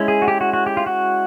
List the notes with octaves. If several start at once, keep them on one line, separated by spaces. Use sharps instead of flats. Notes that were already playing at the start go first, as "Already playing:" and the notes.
Already playing: G#3 C#4 E4
G#4
F#4
G4
F#4
F#4
G4
F4
F#4